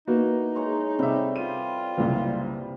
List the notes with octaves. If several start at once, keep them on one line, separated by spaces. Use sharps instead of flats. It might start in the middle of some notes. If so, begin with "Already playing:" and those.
A#3 B3 D#4 E4 F#4
G#3 C#5 A#5
A2 C3 G3 E5
C4 F4 B4 D#7
F#1 C2